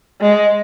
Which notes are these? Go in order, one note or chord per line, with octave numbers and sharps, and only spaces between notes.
G#3